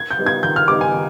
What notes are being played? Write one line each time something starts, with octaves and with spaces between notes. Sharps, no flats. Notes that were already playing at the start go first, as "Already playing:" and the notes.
Already playing: G#6
G6
G3 B3 D#4
G#6
D#3 G6
F6
G3 B3 D#4 D6
G#5
D#3